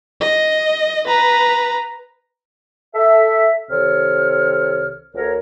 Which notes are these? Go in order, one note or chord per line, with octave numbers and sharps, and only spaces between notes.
D#5
B4 A#5
A4 E5
C2 C3 D#3 A4 C#5 F6
D2 A#4 C#5